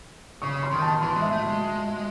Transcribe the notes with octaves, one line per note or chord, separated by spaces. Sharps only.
C#3 C#6
C6
D#3
A5
E3 C6
G#3
E5
A3
G#3